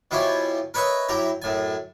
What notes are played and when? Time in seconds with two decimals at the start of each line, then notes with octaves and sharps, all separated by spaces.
0.11 B2 F3 E4 G4 C#5 G#5
0.74 A#4 B4 C#5 D#5 E5
1.09 F#2 E4 G4 A#5
1.42 F#2 A2 G#5